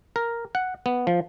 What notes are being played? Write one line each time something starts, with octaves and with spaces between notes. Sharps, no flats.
A#4
F#5
B3
F3